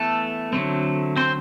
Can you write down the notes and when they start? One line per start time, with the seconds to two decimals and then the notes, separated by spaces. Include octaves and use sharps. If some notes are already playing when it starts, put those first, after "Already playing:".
Already playing: E3 A3 B3 A4
0.53 D3 F#3 A3 C4
1.16 C4 C5